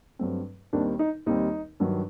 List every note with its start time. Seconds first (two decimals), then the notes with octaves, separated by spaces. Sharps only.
0.19 G2 F#3 A3 C4
0.73 D#2 D#3 G3 C4 D4
0.99 D#4
1.26 D#2 D#3 G3 C4 D#4
1.80 G2 D#3 F#3